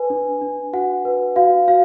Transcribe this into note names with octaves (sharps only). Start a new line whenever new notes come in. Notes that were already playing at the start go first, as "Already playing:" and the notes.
Already playing: B4 G#5
D4
D4
F#4 F#5
B4
F#4 F5
F#4 F5